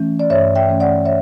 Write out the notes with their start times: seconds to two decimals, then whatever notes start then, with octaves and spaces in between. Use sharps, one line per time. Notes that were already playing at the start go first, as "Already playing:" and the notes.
Already playing: E3 A3 C#4
0.19 D5
0.30 G2 C#5 E5
0.55 E5 G5
0.68 E3 A3 C#4
0.80 D5 F#5
1.05 C#5 E5